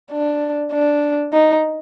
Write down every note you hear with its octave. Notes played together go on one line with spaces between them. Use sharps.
D4
D4
D#4